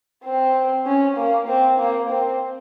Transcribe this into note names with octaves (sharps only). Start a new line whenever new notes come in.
C4
C#4
A#3
C4
A#3
C4